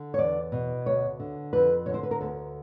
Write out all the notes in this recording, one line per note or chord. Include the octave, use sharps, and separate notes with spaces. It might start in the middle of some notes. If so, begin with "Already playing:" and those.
Already playing: D3
C#5
E2 D5
B2
D2 C#5
D3
F2 B4
D3 C#5
C5
B4
A#4
D2 A4